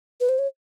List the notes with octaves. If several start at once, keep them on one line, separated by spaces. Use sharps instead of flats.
B4
C5
C#5